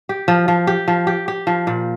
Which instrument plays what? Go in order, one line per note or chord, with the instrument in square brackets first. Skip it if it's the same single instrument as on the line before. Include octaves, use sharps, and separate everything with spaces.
[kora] G4
F3
F3
G4
F3
G4
G4
F3
A#2